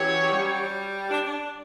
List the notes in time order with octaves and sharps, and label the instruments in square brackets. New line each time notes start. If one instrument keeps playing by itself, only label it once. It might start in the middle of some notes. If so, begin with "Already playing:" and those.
Already playing: [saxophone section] E3 [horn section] F#3 C#4 G4 C#5
[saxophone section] G3
D4
D4